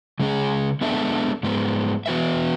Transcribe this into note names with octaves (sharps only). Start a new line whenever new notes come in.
C#3 G#3 C#4 G#4
G#3 B3 D4 A4 E5
G#2 G#3 B3
E3 B3 F#4 B4 E5